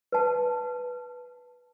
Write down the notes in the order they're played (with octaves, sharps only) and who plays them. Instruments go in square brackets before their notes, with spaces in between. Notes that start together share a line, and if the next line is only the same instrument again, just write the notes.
[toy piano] B4 A5